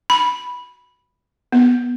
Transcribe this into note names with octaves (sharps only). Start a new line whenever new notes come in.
B5
B3